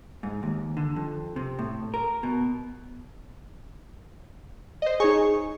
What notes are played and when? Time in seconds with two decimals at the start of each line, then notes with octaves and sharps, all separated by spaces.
0.23 G#2
0.43 D#2
0.77 D3
0.96 F2
1.36 C3
1.59 A2
1.94 A#4
2.23 B2
4.82 C5 D#5
5.00 D#4 G#4 C#5 C#6